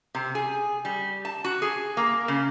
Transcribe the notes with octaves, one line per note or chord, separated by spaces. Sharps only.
C3
G#4
G3
A5
F#4
G#4
A#3
C#3